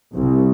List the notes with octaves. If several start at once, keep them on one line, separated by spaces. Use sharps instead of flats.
C2